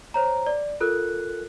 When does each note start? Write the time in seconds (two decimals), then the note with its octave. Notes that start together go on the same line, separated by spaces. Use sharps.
0.14 C5 C#5 A#5
0.47 D5
0.80 F4 A4 A#4 F#6